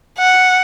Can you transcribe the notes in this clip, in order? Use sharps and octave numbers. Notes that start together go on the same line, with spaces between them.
F#5